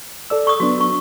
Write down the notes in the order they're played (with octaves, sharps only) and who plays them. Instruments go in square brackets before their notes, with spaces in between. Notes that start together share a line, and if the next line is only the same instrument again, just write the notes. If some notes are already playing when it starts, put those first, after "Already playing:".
[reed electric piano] A4 D5 E6
[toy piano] C#6 D#6
[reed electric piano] F#3 B3 D4 [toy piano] F#4
[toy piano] C#6